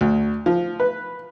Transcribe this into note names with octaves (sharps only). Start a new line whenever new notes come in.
D2
F3
B4